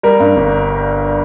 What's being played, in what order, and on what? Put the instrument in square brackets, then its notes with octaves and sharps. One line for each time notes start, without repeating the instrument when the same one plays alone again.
[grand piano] G3 A#4
G2
G1